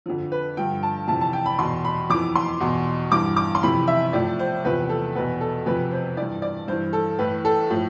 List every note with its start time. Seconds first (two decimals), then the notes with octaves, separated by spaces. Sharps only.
0.06 F2 D3 F3
0.32 B4
0.57 G2 D3 F3 G5
0.83 A5
1.08 F2 C3 E3 A5
1.21 A5
1.33 G5
1.46 B5
1.59 E2 B2 C6
1.85 B5
2.10 F2 E3 D6
2.35 C6
2.60 E2 B2
3.11 G2 E3 D6
3.37 D6
3.55 C6
3.63 F2 C3 E3 B5
3.88 E5
4.13 A2 F3 D5
4.39 C5
4.64 E2 C3 F3 B4
4.89 A4
5.15 E2 B2 B4
5.41 A4
5.66 F2 C3 F3 B4
5.91 C5
6.17 G2 E3 D5
6.42 D5
6.68 G2 E3 C5
6.93 A4
7.19 A2 E3 B4
7.45 A4
7.70 A2 F3